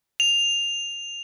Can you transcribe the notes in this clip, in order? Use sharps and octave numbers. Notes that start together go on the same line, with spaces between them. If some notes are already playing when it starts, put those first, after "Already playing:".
F7